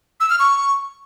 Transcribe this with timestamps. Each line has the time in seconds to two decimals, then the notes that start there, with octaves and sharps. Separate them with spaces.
0.20 E6
0.30 F6
0.39 C#6